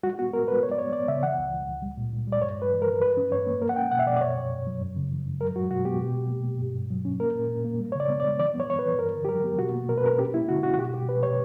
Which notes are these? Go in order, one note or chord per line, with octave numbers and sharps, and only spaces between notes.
G3 F#4
B3 F#4
B3 A#4
G3 B4
B3 C#5
D5
B3 C#5
B3 D5
C#3 E5
E3 F#5
C#2
E3
C#2
G3
A#2
A#2
G3
D5
G2 C#5
G2 B4
E3
A#4
E3
G2 B4
C#4
G2 C#5
A#3
A#3 A#4
F#5
C#4 G5
B2 F#5
E5
B2 D5
D5
F#2 C#5
F#2
F#2
F#3
F#2
C#3
E3
F#2
F#3 A#4
F#3 F#4
B2 F#4
B3 G4
B2
B2
A#3
B2
G2
G2
F#3
C#4
A#3 A#4
A#2
A#2
A#3
G3
C#5
C#3 D5
B3
D5
G3
E3 D5
B3
C#5
E3 C#5
B4
E3
G2 A#4
D3
G4
F#3 A#4
B3
B2 F#4
A#3
B2 A#4
B4
C#4 A#4
C#4 G4
A#3 E4
D3 F#4
C#4 F#4
F#4
B2 G4
B2 G4
B2 B4
B2 C#5